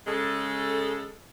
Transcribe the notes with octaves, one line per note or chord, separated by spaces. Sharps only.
C#3 G#3 A4